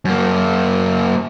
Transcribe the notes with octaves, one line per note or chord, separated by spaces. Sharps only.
F#2 A#3